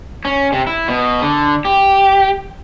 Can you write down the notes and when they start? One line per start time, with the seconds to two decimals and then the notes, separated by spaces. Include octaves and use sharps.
0.25 C#4
0.52 C3
0.67 E4
0.88 B2
1.22 D3
1.65 G4